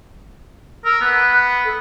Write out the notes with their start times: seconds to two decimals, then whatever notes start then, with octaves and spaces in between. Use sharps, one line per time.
0.85 A#4 E6
1.01 B3 F#6
1.65 A4